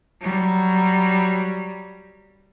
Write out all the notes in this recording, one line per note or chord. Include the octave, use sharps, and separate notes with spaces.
F#3 G3